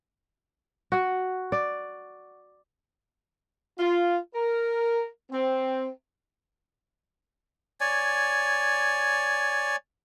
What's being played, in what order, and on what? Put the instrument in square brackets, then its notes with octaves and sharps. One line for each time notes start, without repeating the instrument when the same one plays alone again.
[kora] F#4 F#5
D5
[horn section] F4
A#4
C4
[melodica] C#5 D5 G#5